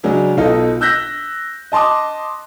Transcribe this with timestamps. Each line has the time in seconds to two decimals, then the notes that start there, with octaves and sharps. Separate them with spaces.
0.03 C#3 F#3 G#3 D4
0.37 B1 B2 D#4 F4 A4 D#5
0.81 E6 F#6 G6 A#6 B6
1.72 D#5 A5 C6 D6 D#6